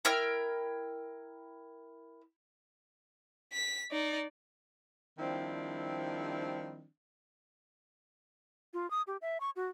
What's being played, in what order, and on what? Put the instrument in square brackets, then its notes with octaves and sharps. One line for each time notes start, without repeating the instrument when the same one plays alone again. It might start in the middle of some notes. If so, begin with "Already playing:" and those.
[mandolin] E4 A#4 G5 F6
[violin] B6
D#4 D5
[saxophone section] D#3 F3 G3 C4 D4 E4
[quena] F4
D#6
G4
E5
C#6
F#4